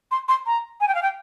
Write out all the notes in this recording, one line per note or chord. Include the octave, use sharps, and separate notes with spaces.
C6
C6
A#5
G#5
G5
F5
G5